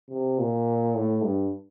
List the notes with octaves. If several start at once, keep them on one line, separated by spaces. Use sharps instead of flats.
C3
A#2
A2
G2